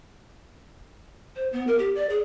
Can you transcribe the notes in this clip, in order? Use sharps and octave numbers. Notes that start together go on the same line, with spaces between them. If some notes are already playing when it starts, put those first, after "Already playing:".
C5
B3
A#4
G4
D5
G#4